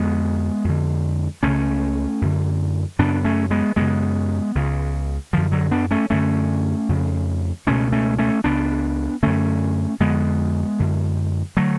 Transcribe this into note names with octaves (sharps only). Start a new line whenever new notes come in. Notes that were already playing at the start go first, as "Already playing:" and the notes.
Already playing: F2 D3 G#3 B3
F2 D3
C#2 C#3 A3 C#4
F#2 D3
F#2 C#3 B3 D4
A3 C#4
G#3 B3
F#2 C#3 G#3 B3
C#2 C#3
F#2 D3 F3
D3 F#3
B3 D4
A3 C#4
F#2 D3 A3 C#4
F2 C#3
C#2 B2 A3 C#4
A3 C#4
A3 C#4
C#2 C#3 B3 D4
F#2 D3 A3 C#4
F2 D3 G#3 B3
F#2 D3
D3 F#3 A3